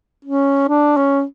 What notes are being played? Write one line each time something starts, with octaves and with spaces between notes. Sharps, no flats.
C#4
D4
C#4